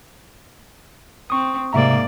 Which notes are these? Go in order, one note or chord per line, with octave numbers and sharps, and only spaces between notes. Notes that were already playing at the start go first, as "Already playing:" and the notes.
C4 C#6 D#6
G#2 C3 A#3 D5 E5 A#5